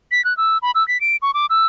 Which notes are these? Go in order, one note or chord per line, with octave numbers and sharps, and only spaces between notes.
B6
F#6
E6
B5
E6
B6
D7
C#6
D6
E6